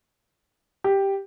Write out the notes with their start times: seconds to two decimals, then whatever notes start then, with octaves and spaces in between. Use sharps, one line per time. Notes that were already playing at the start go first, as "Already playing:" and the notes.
0.84 G4